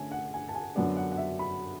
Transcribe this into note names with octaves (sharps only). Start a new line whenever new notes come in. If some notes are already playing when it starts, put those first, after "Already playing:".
Already playing: D3 A3 C#4 G#5 A5
F#5
G#5
A5
G#5
F#2 D3 F#3 B3 D4 F#5
F#5
F#5
E5
B5